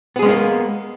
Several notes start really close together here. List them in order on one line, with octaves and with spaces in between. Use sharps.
B3 G#4 G#3 C#4 A#3